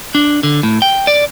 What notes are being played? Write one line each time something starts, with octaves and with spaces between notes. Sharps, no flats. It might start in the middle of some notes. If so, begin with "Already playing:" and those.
D4
D3
A2
G5
D5